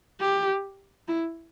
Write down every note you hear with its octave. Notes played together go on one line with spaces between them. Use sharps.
G4
E4